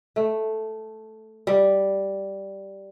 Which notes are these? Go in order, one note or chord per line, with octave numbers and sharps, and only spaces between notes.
A3
G3